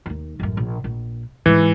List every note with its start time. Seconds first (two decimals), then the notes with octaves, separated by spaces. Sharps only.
0.06 D#2 D#4
0.40 A1 F#2
0.57 A#1
0.84 A#1
1.46 G#2 C#3 E3